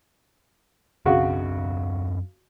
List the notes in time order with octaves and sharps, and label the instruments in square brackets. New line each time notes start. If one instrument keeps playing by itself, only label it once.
[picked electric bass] F#2 C4 D4 [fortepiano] C#3 F#4